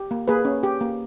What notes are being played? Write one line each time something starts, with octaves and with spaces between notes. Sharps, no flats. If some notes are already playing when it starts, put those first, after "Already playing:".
Already playing: G4
A#3
A#3 G#4 B4
C#4
G4
A#3